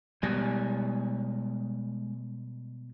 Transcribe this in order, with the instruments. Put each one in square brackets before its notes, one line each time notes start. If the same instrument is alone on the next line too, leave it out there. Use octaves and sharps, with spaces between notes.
[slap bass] B2 G3 [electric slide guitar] G#3 G#5